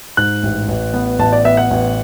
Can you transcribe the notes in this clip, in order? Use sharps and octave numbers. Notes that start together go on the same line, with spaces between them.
G#2 F#6
A1
A1
B3
A1 A5
D5
B3 E5
F#5
A1